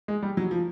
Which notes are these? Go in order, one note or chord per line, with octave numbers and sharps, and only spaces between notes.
G#3
G3
F#3
F3